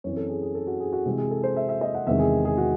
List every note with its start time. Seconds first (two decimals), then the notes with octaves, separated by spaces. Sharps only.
0.04 F#2 E3 C4 C#5
0.17 A4
0.29 G#4
0.42 G#4
0.55 A4
0.67 F#4
0.80 G#4
0.93 F#4
1.05 C3 E3 G#3 C4 G#4
1.18 G#4
1.31 A4
1.43 C5
1.56 E5
1.69 E5
1.81 D#5
1.95 F#5
2.07 E2 C3 D#3 G#3 C4 E5
2.19 G#4
2.45 G#4
2.58 F#4